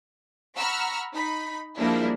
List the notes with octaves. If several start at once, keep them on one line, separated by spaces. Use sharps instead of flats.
F#5 A#5 B5 C#6 E6 F6
D#4 B5
F3 G3 G#3 A#3 D4 E4